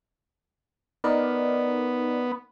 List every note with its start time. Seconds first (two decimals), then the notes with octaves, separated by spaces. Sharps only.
1.04 B3 D#4 A#4 D5